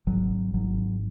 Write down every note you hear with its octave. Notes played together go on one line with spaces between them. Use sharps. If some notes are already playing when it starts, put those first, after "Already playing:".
G#1 F#3
G#1 F#3